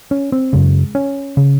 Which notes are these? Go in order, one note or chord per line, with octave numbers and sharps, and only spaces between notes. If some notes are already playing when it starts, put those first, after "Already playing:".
C#4
C4
F#2 C#3 G#3
C#4
C#3